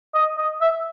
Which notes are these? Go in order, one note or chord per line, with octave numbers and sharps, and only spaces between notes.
D#5
D#5
E5